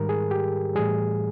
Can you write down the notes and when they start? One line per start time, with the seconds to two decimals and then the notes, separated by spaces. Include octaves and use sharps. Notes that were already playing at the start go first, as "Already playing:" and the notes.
Already playing: G#2 D#3 G3 A#4
0.09 G#4
0.31 G4
0.75 A2 E3 G3 G#4